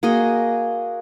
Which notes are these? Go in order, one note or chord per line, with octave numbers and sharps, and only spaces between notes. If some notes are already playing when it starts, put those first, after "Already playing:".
A#3 F#4 G#4 D#5